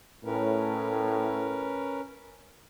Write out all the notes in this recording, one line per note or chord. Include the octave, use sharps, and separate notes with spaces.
A2 C#4 A#4 B4